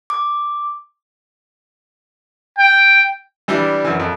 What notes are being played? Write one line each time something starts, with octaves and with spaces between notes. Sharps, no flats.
D6
G5
E3 G3 D4 E4
F#2 E3
F2